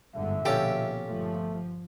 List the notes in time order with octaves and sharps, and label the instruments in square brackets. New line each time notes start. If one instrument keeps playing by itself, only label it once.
[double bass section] G1 G#2 D3 [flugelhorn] E5
[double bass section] A#1 B2 [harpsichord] C#4 F4 A4 [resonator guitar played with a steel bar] G4
[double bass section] G1 F3 [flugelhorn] A3